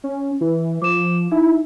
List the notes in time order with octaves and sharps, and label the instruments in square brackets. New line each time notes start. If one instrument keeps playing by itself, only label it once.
[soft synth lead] C#4
E3
[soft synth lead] F3 [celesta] D6 E7
[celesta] D#4 [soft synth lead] E4